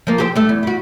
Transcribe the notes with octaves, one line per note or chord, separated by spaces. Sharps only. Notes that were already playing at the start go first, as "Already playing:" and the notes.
F3 A#3
G4 G#4 C5
G2 A3
E2
G3 F#4